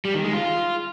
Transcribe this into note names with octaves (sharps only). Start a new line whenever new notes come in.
G3
D#3
G#3
F4